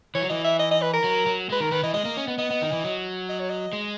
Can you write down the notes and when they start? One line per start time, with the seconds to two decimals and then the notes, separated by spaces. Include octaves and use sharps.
0.15 E3 C#5
0.22 F#3
0.30 E3 D#5
0.44 E5
0.59 D#5
0.71 D#5
0.82 B4
0.93 A#4
1.04 F#3
1.26 F#3
1.50 G#3 B4
1.60 D#3 A#4
1.71 D#3 B4
1.83 E3 D#5
1.93 G#3 D#5
2.05 A#3
2.17 C#4
2.28 B3
2.38 B3 D#5
2.51 B3
2.62 D#3
2.72 E3
2.84 F#3
3.29 D#5
3.40 C#5
3.49 D#5
3.73 G#3